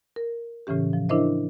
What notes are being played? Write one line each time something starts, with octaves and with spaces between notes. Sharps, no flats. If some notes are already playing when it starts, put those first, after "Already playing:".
A#4
A2 C#3 E3 C#4 G4
F3
D4 E4 A#4 C5 D#5 E5